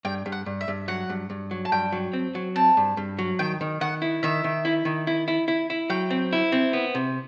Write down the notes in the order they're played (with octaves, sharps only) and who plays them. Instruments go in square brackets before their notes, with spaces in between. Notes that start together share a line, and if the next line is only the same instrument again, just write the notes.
[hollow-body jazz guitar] G2 [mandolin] G5
[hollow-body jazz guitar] G2
[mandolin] F#5
[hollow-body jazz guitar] G2
[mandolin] E5
[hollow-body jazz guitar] G2
[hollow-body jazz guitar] F#3 [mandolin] F#5
[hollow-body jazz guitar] G2
G2
F#3
[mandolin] A5
[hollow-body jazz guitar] G2 [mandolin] G5
[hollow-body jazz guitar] F#3
C4
F#3
[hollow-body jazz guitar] C4 [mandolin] A5
[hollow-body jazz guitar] G2
G2
F#3
[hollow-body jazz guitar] D#3 [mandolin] G5
[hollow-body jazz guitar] D#3
[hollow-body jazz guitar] D#3 [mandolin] F#5
[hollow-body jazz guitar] E4
[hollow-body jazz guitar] D#3 [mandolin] E5
[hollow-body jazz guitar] D#3
E4
D#3
E4
E4
E4
E4
[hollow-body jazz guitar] F#3 [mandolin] G5
[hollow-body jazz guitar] C4
E4
C4
B3
C3